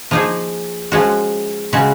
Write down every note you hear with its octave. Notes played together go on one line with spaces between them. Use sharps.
F3 A#3 D#4 G#4
F3 G#3 C#4 F#4
C#3 G#3 C#4 F#4